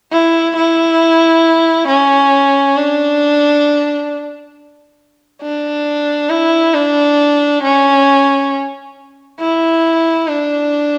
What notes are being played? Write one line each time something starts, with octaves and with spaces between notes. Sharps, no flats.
E4
E4
C#4
D4
D4
E4
D4
C#4
E4
D4